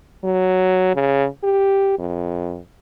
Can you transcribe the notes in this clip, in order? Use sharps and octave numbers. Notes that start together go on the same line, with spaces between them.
F#3
C#3
G4
F2